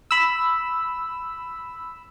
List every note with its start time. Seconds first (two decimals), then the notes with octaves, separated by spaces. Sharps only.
0.11 B5 E6